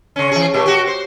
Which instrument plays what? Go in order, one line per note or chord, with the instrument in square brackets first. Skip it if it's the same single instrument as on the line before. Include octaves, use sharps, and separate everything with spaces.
[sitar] C#3 C#4
E3 G#4
A#2 A3 G4
F#4 G4
C5